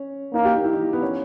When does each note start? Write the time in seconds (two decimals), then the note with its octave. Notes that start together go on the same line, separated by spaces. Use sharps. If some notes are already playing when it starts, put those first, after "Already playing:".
Already playing: C#4
0.33 A#3 D#4
0.45 G4
0.56 D#4
0.64 E4
0.73 D#4
0.93 B3
1.02 C#4